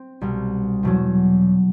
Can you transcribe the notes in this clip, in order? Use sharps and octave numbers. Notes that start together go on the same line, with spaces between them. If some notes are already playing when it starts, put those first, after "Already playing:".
Already playing: C4
C2 B2 G3
E2 B2 F#3